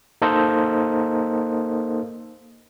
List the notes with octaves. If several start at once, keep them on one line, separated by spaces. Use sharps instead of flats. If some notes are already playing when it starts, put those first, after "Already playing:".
A#3 D#4 A4 A#4 C5 D#5